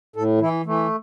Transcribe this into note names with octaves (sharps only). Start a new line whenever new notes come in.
A2 A4
E3 E4
E3 A3